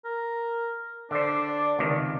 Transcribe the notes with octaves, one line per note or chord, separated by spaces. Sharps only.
A#4
D3 D4 C5 D5
C#2 C3 D#3